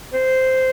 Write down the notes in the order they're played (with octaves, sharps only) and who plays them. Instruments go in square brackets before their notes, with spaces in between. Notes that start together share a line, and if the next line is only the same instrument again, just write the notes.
[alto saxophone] C5